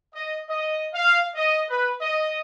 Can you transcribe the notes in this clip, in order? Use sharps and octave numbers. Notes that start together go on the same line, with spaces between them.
D#5
D#5
F5
D#5
B4
D#5